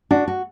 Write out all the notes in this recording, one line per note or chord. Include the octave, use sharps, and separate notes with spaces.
D4 F#4
F#4